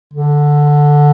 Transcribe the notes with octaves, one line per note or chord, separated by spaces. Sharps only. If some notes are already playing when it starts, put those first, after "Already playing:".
D3